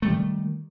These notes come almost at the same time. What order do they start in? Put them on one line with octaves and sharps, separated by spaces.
A3 G3 D#3